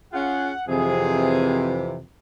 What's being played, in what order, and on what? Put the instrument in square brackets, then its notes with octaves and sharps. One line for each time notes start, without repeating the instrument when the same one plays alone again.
[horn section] C#4 F4 G#4 [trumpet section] F#5
[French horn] F2 [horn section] C3 E3 [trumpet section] G#4